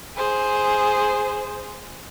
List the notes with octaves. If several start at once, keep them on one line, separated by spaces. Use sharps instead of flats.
G#4 C5